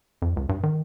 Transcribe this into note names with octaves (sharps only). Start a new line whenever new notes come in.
F2
C#2
G2
D#3